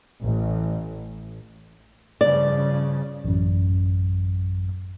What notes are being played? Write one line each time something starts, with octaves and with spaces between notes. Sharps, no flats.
A1
G2 C#3 F3 D5
A1 F#2